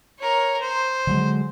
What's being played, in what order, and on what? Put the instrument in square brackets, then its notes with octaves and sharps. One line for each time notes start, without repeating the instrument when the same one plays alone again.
[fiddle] A#4 C#5
C5
[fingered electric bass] D3 F#3 G#3